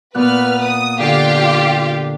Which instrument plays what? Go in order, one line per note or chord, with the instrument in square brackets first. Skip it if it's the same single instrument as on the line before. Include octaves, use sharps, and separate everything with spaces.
[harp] A#2 B3 F#6 [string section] B4 F6
[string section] D#6
[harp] D3 [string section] F4 G4 F5